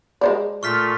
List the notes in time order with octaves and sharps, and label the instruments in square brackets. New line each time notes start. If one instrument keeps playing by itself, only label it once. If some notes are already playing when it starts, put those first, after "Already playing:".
[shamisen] G#3 C5 D5
[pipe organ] A#2 A3 F4 [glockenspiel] C#6 F6 B6